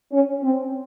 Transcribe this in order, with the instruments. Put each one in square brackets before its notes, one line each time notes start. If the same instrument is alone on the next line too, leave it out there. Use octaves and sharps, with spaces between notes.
[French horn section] C#4
C4